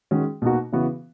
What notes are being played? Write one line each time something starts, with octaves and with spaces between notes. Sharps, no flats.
D#3 G#3 C#4 F#4
B2 A#3 D#4 F#4
C#3 E3 B3 F#4